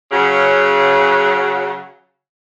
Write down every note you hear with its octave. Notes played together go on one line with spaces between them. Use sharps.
C#3 F#3